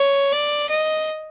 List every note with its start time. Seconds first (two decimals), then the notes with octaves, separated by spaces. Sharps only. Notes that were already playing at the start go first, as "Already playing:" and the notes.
Already playing: C#5
0.32 D5
0.69 D#5